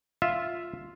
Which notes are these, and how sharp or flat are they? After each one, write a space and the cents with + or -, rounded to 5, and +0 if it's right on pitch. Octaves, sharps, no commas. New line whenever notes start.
F4 +0 E5 +5